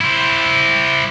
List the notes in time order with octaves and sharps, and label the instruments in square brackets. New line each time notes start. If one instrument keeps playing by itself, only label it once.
[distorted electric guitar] E4 C5